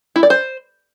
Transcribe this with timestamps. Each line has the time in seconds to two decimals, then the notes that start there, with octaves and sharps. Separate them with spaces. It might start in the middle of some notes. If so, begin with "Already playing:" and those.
0.16 E4
0.23 D5
0.30 C5